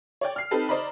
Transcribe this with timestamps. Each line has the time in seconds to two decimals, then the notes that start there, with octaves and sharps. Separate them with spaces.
0.21 C#5 D5 G5
0.36 F6 C7
0.51 C4 D#4 G4 A4 B4 A5
0.69 C5 D5 D#5 A#5 B5